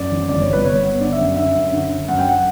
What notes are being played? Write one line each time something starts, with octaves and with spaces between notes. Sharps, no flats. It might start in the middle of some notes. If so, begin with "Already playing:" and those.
Already playing: F#2 D5
E3
G1 D5
C#5
G1
B4
G1 C#5
B3
D3 D5
E5
F#2
D3 E5
F#2
D3
D3
F#2 F#5
G5
F#5